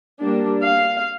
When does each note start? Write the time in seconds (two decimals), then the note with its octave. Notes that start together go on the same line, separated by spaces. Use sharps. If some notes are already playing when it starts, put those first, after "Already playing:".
0.19 G3 A#3 D4
0.63 F5